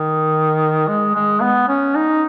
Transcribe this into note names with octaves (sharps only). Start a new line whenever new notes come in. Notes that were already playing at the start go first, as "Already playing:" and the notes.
Already playing: D#3
G#3
G#3
B3
C#4
D#4